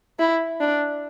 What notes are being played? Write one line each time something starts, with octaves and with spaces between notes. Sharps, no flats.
E4
D4